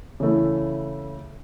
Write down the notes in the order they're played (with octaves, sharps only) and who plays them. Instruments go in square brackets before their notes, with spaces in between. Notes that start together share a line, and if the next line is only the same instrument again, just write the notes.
[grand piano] C#3 E3 A3 E4